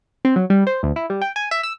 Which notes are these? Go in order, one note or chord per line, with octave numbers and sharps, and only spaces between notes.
C4
F#3
G3
C5
D2
E4
G3
G5
G#5
E5
E6